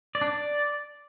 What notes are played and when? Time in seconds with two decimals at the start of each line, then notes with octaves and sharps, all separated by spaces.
0.15 D5
0.21 D4
0.28 D5